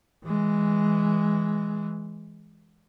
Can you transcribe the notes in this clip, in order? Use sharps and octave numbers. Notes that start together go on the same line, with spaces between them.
E3 G#3